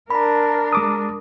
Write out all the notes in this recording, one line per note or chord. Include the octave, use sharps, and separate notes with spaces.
D4 A#4 A#5 B5
G#3 D6 D#6